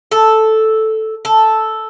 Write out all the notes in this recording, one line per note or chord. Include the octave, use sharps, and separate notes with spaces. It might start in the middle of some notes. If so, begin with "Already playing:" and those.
A4
A4